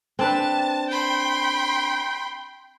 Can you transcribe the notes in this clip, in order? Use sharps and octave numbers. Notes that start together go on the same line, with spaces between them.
C4 D4 B4 A5
G5 B5 C6